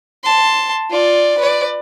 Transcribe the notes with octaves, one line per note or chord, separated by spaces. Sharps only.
A5 C6
F4 D5
B4 D5